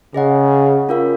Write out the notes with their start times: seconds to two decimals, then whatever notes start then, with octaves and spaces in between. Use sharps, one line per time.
0.14 C#3 G#4 D#5 F#5
0.89 C#4 F4 A#4 C#5 F5